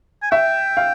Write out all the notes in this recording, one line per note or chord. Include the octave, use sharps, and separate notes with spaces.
G#5
E5 G5
F5